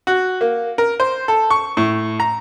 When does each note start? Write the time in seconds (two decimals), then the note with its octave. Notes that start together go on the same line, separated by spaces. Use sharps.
0.07 F#4
0.41 A#3
0.78 A#4
1.00 C5
1.28 A4
1.50 C#6
1.77 A2
2.20 A#5